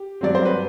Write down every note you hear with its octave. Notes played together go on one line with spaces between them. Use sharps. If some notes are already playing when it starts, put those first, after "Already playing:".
Already playing: G4
G2 F#3 C4 D5
C5
B4